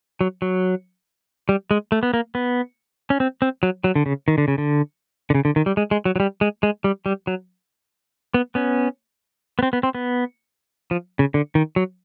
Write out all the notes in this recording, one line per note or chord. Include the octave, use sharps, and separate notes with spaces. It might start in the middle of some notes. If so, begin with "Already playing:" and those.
F#3
F#3
G3
G#3
A3
B3
A#3
B3
C#4
C4
C4
F#3
F#3
D3
C#3
D#3
D3
C#3
D3
D3
C#3
D3
D#3
G3
G#3
G#3
F#3
F#3
G3
G#3
G#3
G3
G3
F#3
B3
B3 C#4
B3
C4
B3
C4
B3
F3
C#3
D3
D#3
F#3